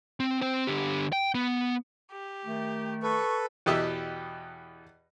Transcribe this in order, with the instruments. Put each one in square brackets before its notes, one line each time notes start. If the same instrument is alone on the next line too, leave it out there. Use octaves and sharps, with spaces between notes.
[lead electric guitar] C4
C4 C5
D3 G4
G5
B3
[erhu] G4
[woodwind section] D#3 A3
[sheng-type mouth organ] A4 B4 [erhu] C#6
[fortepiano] E2 B2 G4 D#5 E5 E6